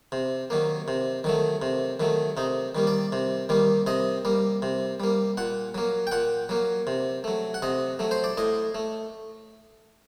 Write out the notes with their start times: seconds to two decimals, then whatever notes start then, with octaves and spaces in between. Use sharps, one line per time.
0.12 C3
0.50 D#3 F#3 A#3
0.88 C3
1.24 D#3 F#3 A3
1.62 C3
2.00 D#3 F#3 A3
2.37 C3 D#4
2.75 D#3 G3 A#3
2.87 D5
3.12 C3
3.49 D#3 G3 A#3
3.87 C3 D#5
4.25 G3 A#3
4.62 C3
5.00 G3 A#3
5.37 A#2 F#5
5.75 F#3 A#3
6.07 G5
6.11 A#2 F#5
6.49 F#3 A#3
6.87 C3
7.24 F#3 A3
7.54 F#5
7.62 C3 D#5
7.99 F#3 A3
8.11 C5
8.24 D5
8.38 A2 D#5
8.75 A3